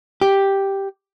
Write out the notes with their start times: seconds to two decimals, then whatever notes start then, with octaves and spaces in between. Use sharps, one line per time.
0.21 G4